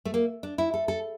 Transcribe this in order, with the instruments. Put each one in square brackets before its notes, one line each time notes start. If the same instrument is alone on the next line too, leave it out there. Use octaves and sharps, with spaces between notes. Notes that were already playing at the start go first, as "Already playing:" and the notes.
[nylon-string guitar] A3
A#3
D4
E4
A4
A4